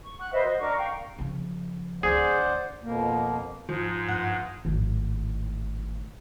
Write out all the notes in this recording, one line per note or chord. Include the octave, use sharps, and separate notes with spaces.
C#6
F#5 F#6
B4 C5 D#5 E5
F#4 D#5
D4 A#4 C#6 D6
A#4 F5 G5 C#6
C#3 F3
D2 D4 G#4 C5 D5 F#5
F2 B2 A#3
G#2 F3
G2 F#5
G#1 A2